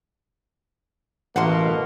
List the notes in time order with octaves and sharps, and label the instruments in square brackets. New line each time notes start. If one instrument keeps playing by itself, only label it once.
[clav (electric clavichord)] A1 [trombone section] B2 A#3 [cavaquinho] F#5 A5 C6